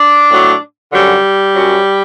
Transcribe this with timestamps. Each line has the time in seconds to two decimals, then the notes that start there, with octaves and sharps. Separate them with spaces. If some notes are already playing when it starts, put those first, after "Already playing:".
Already playing: D4
0.30 A2 F#3
0.93 F#2 D3 F#3 G3
1.56 F#2 F#3